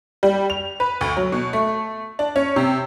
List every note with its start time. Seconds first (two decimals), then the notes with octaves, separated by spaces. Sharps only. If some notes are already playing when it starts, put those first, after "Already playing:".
0.23 G3
0.50 F7
0.80 B4
1.01 D2
1.17 F#3
1.32 B2
1.53 A3
2.19 D4
2.36 C#4
2.56 C3